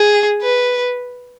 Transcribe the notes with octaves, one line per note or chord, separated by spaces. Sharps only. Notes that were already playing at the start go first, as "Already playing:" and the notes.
Already playing: G#4
B4